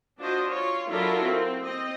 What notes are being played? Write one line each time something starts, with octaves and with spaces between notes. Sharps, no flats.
D4 F4 F#4 C5 D#5
F4 C#5
F#3 D4 E4 F4 A4 A#4
C4
C4 D#5